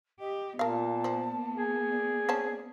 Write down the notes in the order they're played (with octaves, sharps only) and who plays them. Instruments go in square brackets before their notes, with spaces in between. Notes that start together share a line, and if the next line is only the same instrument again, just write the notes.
[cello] G4 [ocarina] D#5
[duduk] A#2 [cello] A#3 B3 [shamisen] A#4 F5 [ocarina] A5
[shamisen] F3
[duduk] G#4
[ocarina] D5
[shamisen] C4 C#4 A5